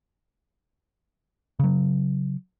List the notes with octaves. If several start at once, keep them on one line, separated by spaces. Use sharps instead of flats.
C#3 F#3